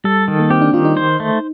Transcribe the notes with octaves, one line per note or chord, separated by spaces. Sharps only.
G3 A4
D#3
A#3
C4 G4
D4
D#3 F4
D#4
C5
A3